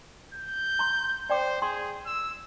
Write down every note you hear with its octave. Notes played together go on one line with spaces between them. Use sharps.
G6
A#5 C6
C5 D5 G5 D6
G#4 C6
E6